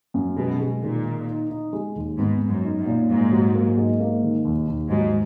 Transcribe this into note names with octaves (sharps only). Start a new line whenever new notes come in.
F#2
B2 G#3
G#3
A#2 D#3
D#4
D#4
D#4
G#3
D#2
G#2 B3
B3
F#2
D#4
F#2
A#2
G#2 A#3
F#3
A#3
G#2
A#3
D#3
D#2
D#2
G#2 F#3